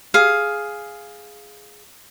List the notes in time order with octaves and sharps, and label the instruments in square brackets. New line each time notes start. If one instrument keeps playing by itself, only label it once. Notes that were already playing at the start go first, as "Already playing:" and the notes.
[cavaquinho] G#4 F5